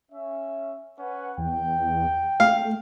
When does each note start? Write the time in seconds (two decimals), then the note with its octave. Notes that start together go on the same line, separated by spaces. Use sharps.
0.12 C#4 E5
0.99 C#4 B4 F#5
1.38 E2 G5
2.40 A3 F5